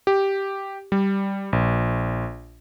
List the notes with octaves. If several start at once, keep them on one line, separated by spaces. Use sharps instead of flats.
G4
G3
A#1